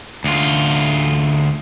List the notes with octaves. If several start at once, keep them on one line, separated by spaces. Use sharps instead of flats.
D2 F4